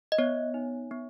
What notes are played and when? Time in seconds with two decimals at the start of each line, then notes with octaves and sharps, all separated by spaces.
0.12 D#5
0.18 B3 C#5
0.54 D#4
0.91 B3